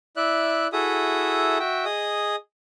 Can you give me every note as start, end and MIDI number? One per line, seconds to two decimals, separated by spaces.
0.17 0.67 64
0.17 0.67 74
0.17 0.67 76
0.17 0.67 90
0.73 1.58 64
0.73 1.58 66
0.73 1.58 68
0.73 1.58 69
0.73 1.58 76
0.73 1.58 87
1.60 1.85 66
1.60 1.85 76
1.60 1.85 79
1.85 2.36 68
1.85 2.36 75
1.85 2.36 87